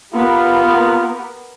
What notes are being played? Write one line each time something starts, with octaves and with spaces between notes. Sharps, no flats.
B3 F4 G4 A#4